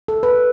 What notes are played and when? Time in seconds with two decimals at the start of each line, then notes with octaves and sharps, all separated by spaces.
0.08 A4
0.23 B4